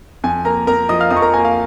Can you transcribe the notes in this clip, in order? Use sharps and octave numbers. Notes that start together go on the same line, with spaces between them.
F2 G#5
A#3 A#4 A#5
F2 A#4 A#5
F3 D#5 D#6
F5 F6
F2 D#5 D#6
C#6
A#4 A#5
A#3 G#5
F5